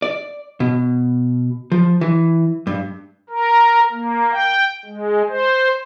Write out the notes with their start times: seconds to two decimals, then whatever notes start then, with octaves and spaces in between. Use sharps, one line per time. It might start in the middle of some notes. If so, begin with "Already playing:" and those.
0.02 D5
0.60 B2
1.72 F3
2.01 E3
2.67 G2
3.30 A#4
3.92 A#3
4.32 G5
4.85 G#3
5.28 C5